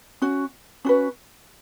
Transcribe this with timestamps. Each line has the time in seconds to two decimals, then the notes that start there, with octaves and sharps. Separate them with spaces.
0.22 C#4 F#4
0.85 C#4 F#4 B4